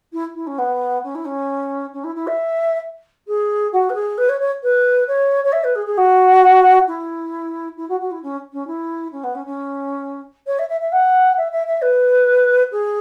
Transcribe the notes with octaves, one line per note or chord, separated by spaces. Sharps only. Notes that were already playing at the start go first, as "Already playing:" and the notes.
E4
E4
C#4
B3
C#4
E4
C#4
C#4
E4
E4
E5
G#4
F#4
B4
G#4
B4
C#5
C#5
B4
C#5
C#5
E5
B4
G#4
G#4
F#4
E4
E4
F#4
F#4
E4
C#4
C#4
E4
C#4
B3
C#4
C#4
C#5
E5
E5
E5
F#5
E5
E5
E5
B4
G#4